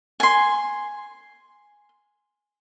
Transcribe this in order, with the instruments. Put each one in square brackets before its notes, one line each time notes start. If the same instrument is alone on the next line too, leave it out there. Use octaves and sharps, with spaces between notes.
[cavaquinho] G#5 C6